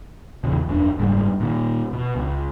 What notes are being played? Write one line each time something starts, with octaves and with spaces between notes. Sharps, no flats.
A#1 E2 C#3
E1 F#2 C4 D4
F#1 G#2 G3
A#2 D#3
B2
C#2